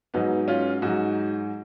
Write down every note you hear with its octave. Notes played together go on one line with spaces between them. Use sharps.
G#2 F#3 B3 D#4
C#4 F4
G#2 F#3 D#4 F#4